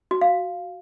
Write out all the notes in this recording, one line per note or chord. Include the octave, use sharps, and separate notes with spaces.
F#4
F5